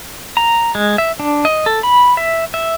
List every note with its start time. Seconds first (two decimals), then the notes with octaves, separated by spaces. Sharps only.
0.37 A#5
0.75 G#3
0.98 E5
1.20 D4
1.45 D#5
1.66 A4
1.83 B5
2.17 E5
2.54 E5